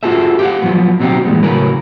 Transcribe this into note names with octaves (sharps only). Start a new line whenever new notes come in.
F4 F#4 G#4 A4 B4 E5
G4 C5 C#5 F5 F#5
F3 F#3 B3
B2 F#3 C4 D#4 F#4 G4
A#2 E3 G3 G#3 B3
A2 C#3 F#3 C#4 A#4 B4